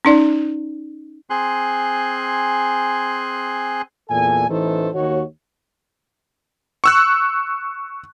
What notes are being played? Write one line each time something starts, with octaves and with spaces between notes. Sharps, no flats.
C#4 D#4 D5
C4 G#4 G#5 C6 F#6
E2 A#2 A4 G#5
A1 E3 A3 D#4 A4 C5
D#2 F#4 C#5
C#6 E6 F#6